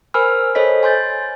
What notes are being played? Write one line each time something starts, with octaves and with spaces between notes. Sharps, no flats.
A#4 C5 G#5 B5 E6 F6
A4 C5 C#5 D#5 B6
G#5 C6 G6 A6